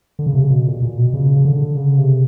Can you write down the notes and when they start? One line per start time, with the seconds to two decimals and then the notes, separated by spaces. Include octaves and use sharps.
0.19 D3
0.26 C#3
0.34 C3
0.42 C#3
0.50 B2
0.67 A#2
0.82 A#2
0.98 B2
1.14 C#3
1.37 C#3
1.45 D3
1.76 C#3
1.98 C3